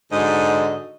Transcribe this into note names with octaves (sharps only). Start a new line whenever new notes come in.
G#2 D3 F#4 D#5